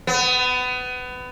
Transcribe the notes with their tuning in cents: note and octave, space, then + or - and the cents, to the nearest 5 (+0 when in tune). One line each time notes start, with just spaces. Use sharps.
B3 +25